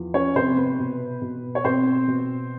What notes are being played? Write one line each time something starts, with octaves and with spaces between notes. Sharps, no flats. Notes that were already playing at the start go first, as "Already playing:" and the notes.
Already playing: E2 F3
C#4 C#5
C3 C4 C5
B3 B4
B2
B2
C#5
B2 C4 C5
B2